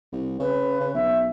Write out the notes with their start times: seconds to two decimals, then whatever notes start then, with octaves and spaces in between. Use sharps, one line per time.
0.12 C2
0.40 C#3 B4
0.80 C#3
0.94 B1 E5